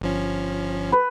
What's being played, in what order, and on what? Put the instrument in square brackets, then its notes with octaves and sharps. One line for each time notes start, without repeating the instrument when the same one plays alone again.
[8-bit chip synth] G1 F3 C#4
[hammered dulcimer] B4